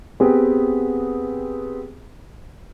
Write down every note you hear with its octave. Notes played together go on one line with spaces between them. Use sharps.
B3 C4 G4 G#4 B4